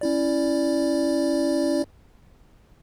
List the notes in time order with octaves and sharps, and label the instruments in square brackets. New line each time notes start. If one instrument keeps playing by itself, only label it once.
[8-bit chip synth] C#4 E4 D5